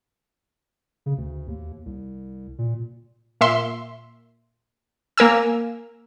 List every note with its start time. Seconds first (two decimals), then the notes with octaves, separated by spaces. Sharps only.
1.06 C#3
1.17 D2
1.48 D#2
1.86 C2
2.58 A#2
3.41 A#2 E5 C6
5.18 A#3 A#4 G#5 E6